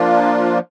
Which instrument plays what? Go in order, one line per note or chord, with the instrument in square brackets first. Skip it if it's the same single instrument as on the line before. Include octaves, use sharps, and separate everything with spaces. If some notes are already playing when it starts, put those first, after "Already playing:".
Already playing: [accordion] F3 A#3 D4 F4